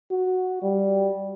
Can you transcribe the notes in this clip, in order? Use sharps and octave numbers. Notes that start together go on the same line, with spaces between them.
F#4
G3